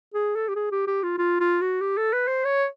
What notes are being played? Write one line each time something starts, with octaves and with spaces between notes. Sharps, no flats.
G#4
A4
G4
G#4
G4
G4
F4
F4
F4
F#4
G4
A4
B4
C5
C#5